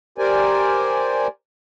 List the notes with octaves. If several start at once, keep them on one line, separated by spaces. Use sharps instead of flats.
G4 A#4 C5 D5 G#5